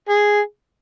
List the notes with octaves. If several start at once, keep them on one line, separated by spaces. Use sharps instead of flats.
G#4